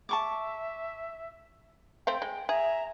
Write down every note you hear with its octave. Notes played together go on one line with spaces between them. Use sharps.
E5 A5 C#6 D6
A3 C4 F5 G5
G#3
G#4 E5 A#5